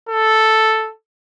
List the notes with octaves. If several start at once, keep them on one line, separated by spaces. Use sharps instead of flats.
A4